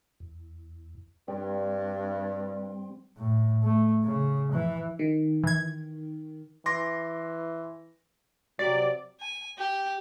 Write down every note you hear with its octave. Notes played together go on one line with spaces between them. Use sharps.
E2
G2 G3 C4
A2
A3
C#3
E3
D#3
E3 G#6
E3 C6 D6 A#6
C3 F#3 D5
G#5
G4